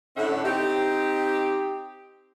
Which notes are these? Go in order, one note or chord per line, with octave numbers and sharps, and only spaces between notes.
A2 D3 C#4 E5 F#5
C4 D#4 G4